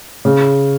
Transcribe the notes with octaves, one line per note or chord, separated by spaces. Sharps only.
C#3